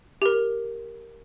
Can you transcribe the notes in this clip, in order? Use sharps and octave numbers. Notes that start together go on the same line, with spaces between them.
G4 A#4